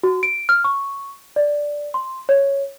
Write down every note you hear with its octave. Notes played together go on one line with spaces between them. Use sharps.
F#4
D7
F6
C#6
D5
C6
C#5